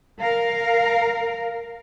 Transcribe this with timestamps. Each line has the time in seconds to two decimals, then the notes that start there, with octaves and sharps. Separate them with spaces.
0.20 A#4 F5